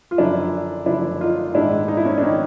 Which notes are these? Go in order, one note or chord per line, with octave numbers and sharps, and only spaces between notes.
F4
F#1 F#2 D3 F3 D4 E4
F#1 F#2 D3 F3 D4 E4
D#4 F4
A#1 G#2 D#3 D4 E4
D#4
E4
C#4 D#4
D4
D#3 C#4 D#4